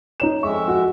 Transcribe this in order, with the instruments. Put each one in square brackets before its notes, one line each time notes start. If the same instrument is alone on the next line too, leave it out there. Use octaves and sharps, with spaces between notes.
[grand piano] D#4 C#5 E7
[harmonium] F2 G#3 E5 [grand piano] C#6
[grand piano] F#4